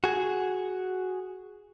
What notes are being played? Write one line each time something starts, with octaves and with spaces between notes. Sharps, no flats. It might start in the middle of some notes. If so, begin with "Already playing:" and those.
F#4 G#4